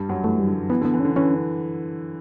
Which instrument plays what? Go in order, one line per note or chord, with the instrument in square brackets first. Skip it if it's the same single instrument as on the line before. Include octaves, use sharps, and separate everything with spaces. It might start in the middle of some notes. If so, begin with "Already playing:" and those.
Already playing: [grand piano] G2 G3
F#2 F#3
[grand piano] E3 [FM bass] A3
[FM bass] G3
[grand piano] D3
[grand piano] E3 [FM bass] B3
[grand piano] D3 [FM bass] B3
[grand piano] E3
[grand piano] D3 [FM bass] C#4
[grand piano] E3 [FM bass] C#4